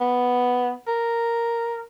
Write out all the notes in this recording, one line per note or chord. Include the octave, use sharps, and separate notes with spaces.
B3
A#4